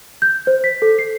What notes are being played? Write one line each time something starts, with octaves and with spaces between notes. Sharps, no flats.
G6
C5
B6
A4
C7